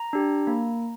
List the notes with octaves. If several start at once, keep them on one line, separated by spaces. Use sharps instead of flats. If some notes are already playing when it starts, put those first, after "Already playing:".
Already playing: A#5
D4 G4
A#3